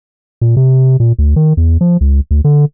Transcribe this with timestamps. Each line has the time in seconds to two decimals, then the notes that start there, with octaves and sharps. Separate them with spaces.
0.41 A#2
0.57 C3
1.00 A#2
1.19 D2
1.36 D#3
1.57 E2
1.81 F3
2.01 C#2
2.31 D2
2.44 D3